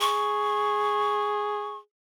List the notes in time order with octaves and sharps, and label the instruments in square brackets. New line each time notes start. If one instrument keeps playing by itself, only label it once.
[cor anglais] G#4 [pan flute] C#6